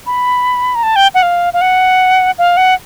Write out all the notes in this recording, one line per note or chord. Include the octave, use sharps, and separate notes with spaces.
B5
A#5
A5
G5
F#5
F5
F5
F#5
F5
F#5